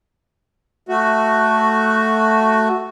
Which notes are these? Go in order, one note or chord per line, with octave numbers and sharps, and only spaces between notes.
A3 F#4